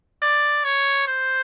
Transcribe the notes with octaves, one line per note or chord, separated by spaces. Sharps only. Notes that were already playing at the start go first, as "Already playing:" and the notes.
D5
C#5
C5